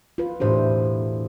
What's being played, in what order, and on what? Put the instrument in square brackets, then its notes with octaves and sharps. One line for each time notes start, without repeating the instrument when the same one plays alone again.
[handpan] F4 B4
[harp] E1 A2 D#7 [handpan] D4 G4 C5